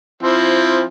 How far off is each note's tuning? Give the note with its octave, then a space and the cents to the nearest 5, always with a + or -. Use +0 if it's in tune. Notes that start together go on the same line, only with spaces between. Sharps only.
F3 +0 C4 +15 E4 +0